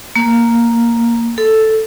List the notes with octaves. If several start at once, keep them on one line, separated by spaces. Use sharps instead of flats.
A#3
A4